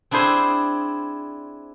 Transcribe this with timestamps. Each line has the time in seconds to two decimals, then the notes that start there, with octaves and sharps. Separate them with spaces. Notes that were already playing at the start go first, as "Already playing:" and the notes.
0.11 C4 D4 E4 G#4 C5 C6